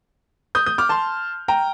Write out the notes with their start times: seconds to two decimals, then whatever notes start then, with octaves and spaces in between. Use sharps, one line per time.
0.55 D#6 G6
0.66 D#6 G6
0.78 D6 F6
0.89 A5 C6
1.48 G5 A#5